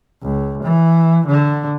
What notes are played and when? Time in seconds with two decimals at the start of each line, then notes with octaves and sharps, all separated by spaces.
0.22 C#2
0.63 E3
1.27 D3